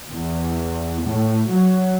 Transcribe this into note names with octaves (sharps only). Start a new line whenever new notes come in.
E2
A2
F#3